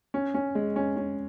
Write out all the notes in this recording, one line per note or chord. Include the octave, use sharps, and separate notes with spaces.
C#4
C#4
G#3
C#4
C#4